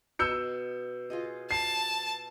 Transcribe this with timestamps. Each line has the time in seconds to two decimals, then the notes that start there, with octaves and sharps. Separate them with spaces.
0.19 B2 D#5 A5 E6 G6 C#7
1.10 F4 G#4 D#5
1.51 A5 C7